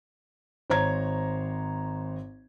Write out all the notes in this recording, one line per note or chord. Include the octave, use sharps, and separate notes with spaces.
G#1 C5 C#5 A#5 G#6